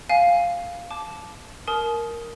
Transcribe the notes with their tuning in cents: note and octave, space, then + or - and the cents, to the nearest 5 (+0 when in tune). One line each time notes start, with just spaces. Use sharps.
F5 +0 G#5 +0
A5 -20 D6 +0
A#4 +0 A5 -45 D#6 +10